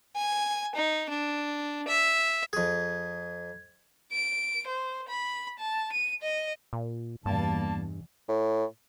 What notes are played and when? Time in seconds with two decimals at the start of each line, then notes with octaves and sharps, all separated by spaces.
0.16 G#5
0.75 D#4
1.09 D4
1.87 E5
2.53 F2 G#4 G#6
4.13 D7
4.67 C5
5.08 B5
5.59 A5
5.92 D#7
6.22 D#5
6.73 A#2
7.26 E2 G2 B2 E3 G3 A#3 A5
8.29 A2